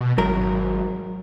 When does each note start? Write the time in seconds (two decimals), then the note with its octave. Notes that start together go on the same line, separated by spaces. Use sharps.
0.01 B2
0.18 G#1 F#3 A#4